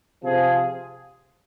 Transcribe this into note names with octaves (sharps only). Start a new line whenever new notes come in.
C3 F3 C4 F4 G#4